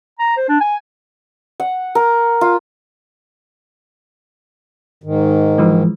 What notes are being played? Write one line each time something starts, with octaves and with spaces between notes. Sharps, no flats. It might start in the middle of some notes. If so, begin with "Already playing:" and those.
A#5
C5
D4
G#5
F#5
A#4
F4
G#2 D#3
E3 F3 G#3